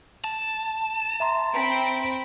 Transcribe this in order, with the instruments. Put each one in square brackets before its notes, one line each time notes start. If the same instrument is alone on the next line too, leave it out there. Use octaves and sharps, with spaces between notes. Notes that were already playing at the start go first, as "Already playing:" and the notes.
[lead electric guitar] A5
[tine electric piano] E5 A#5 C6
[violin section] C4 B5 D7